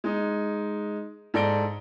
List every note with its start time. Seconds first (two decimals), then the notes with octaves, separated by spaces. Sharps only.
0.04 G#3 D#4
1.34 G#2 A4 D5 A#6 D7 G7